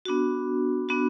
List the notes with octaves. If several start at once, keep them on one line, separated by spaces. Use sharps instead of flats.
B3 D4 F#4
B3 D4 F#4